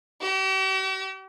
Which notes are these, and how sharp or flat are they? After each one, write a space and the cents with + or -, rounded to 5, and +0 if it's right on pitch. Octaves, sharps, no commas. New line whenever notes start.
G4 -45